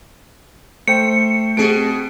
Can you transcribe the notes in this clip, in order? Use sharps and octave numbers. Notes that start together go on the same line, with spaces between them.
A3 C5 G5 C#7
B2 A3 C4 G4 G#4 D7